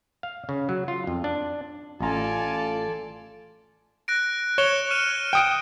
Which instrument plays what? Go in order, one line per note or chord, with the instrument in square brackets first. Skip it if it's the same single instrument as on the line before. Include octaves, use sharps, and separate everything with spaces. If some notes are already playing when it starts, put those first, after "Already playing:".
[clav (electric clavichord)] F5
C#3
F#3
F4
F2
D4
[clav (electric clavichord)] A1 A#5 [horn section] F4 G#5 [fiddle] A4 D5
[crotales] F#6 A#6 D7
[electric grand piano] C#5 [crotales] C#7 E7 G7
[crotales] F6 D#7 E7
D#7
[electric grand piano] G5 D#6 D7